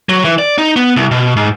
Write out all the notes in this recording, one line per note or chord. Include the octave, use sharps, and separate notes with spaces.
F#3
E3
D5
D#4
B3
C2
B2
G#2